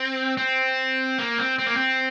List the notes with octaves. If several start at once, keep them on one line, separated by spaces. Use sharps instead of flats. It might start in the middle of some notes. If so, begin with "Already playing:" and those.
Already playing: C4
C4
A#3
C4
C4
A#3
C4